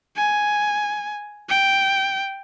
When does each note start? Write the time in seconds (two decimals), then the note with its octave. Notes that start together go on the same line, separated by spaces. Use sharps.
0.17 G#5
1.49 G5